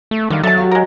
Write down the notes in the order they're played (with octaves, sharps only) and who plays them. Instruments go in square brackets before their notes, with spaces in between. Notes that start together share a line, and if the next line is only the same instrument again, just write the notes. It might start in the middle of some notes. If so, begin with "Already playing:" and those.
[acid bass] A3
[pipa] D3 F5 [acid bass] D#3 [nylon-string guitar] G3
[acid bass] F#3 [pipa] A4 A5 [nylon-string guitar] E5
[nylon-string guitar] F#4 G4 F5
[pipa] G#3 A#4